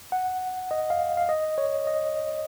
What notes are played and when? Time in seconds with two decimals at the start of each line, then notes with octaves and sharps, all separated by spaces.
0.12 F#5
0.71 D#5
0.90 F5
1.17 F5
1.29 D#5
1.58 C#5
1.87 D#5